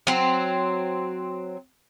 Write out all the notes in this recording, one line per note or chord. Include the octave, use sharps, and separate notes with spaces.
F#3 C4